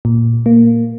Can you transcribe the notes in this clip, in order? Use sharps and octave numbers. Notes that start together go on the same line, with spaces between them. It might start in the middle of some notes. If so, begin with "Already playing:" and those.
A#2
A#3